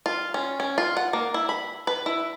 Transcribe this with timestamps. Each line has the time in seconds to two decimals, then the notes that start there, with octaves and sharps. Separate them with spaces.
0.06 F4
0.34 C#4
0.60 C#4
0.78 F4
0.97 F#5
1.13 A#3
1.34 E4
1.49 B5
1.87 B4
2.06 E4